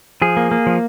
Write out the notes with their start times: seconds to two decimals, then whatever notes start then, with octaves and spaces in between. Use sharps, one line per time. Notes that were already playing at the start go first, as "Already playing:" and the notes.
0.22 F3 G#4
0.37 A#3
0.51 A#3
0.67 F3